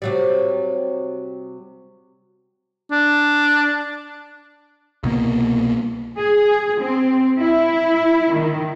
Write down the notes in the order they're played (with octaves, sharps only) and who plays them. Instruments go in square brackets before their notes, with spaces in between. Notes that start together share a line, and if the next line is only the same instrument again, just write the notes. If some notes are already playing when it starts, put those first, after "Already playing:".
[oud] C3 F#3 G3
[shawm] D4
[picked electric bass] C2 B2 A#3
[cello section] G#4
C4
E4
D#3